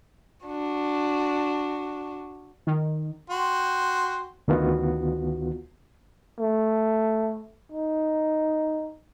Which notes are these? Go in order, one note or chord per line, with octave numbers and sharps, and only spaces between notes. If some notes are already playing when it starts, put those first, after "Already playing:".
D4 F#4
D#3
F#4 G5 C6
D2 D#3 B3 F4 F#4
A3
D#4